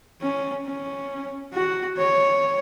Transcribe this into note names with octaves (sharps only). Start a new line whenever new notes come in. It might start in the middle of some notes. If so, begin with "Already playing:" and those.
C#4
C#4
F#4
C#5